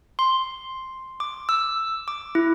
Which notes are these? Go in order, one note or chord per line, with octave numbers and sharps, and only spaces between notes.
C6
D6
E6
D6
E4